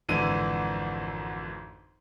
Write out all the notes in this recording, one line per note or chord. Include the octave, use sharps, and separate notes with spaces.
G#1 F2 D3 E3 E4 D#7